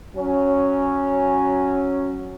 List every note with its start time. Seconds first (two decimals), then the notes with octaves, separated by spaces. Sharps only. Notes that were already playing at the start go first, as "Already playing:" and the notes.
0.16 F#3 C#4